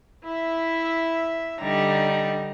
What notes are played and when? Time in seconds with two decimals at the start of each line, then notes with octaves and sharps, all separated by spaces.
0.24 E4 E5
1.61 D3 G3 D#4 A#5